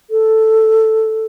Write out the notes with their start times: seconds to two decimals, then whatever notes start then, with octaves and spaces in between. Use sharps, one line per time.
0.10 A4